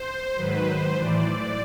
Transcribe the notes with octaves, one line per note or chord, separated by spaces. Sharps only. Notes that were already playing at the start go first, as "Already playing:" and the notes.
Already playing: C5
G#2 D#3 F#3 B4
C5
A2 E3 D5
D5